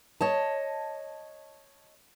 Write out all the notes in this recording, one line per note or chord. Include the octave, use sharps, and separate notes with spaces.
C#5 D#5 A5